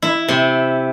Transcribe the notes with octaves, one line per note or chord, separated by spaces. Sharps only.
E4
C3